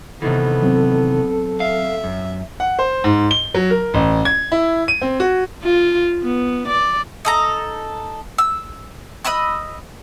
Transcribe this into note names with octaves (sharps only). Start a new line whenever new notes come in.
C3 D#3 E3 B3 A4
F#3 C4
E5 F5
F#2
F#5
C5
G#2
G7
F#3
A#4
A1
G#6
E4
D#7
C4
F#4
F4
B3
D5
D#4 A4 A#5
E6
D#5 B5 E6 F#6